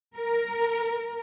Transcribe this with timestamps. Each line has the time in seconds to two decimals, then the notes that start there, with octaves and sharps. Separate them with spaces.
0.16 A#4